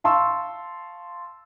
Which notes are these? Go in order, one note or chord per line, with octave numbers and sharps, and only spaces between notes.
F5 A5 C6 C#6 E6